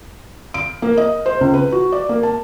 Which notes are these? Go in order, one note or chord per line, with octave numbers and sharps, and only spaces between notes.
D7
A#3
D#5
C5
C#2
B4
F#4
D5
A#3
A5